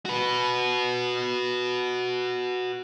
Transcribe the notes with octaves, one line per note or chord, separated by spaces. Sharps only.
F#4 B4